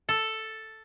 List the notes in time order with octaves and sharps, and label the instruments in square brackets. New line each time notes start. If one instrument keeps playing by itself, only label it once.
[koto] A4